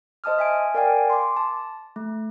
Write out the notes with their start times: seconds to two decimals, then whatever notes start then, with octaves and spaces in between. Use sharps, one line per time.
0.24 C5 D#5 A5 D#6 F6
0.39 E5 G#5 D7
0.74 A#4 D5 F5 G5 G#5
1.10 C6 D6
1.37 A5
1.96 A3